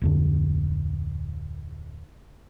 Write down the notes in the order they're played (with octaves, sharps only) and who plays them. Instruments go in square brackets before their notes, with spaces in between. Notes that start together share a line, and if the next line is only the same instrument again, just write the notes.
[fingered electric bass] D1 F2 D3